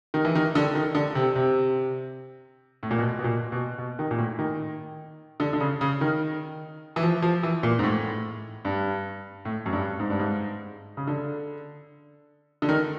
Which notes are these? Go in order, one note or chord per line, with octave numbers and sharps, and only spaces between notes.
D#3
E3
D#3
D3
D#3
D3
C3
C3
A2
A#2
B2
B2
A#2
B2
B2
D#3
A#2
A2
D#3
D3
D3
C#3
C#3
D#3
E3
F3
F3
E3
A#2
G#2
A2
G2
A2
F#2
G2
G#2
G2
G#2
C#3
D3
D3
D#3